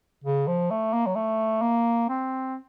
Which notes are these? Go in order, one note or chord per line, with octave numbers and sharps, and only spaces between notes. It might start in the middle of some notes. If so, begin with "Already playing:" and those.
C#3
F3
A3
A#3
F#3
A3
A#3
C4